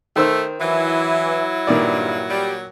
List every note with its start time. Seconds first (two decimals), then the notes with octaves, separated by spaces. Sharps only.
0.16 D#3 A3 C5 E6
0.61 E3 F#3 E4
1.67 G2 A#2 D#3 D5
2.29 G3